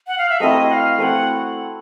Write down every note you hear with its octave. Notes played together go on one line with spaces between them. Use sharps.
F#5
F5
E5
A3 C4 E4 A4 D#5
F#5
F5
A3 C4 E4 A4 F#5 G#5